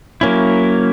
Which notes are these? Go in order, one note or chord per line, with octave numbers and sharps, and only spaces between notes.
F#3 A#3 C#4 E4